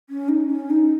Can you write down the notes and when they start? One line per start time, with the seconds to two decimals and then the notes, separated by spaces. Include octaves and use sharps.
0.10 C#4
0.29 D#4
0.50 C#4
0.70 D#4